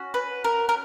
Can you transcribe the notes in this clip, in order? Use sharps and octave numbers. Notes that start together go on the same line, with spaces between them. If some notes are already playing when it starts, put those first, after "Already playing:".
Already playing: C#4 F#4
B4
A#4
A#4